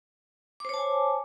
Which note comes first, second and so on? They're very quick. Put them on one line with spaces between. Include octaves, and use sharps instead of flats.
D6 C5 C#5 A5 G#5